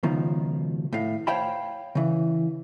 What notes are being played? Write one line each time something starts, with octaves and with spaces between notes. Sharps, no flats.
C#2 B2 D#3 F3
A2 F5
C5 C#5 F5 G5 A5 B5
C#3 E3